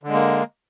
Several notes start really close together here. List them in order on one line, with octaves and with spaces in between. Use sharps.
D3 G#3 A#3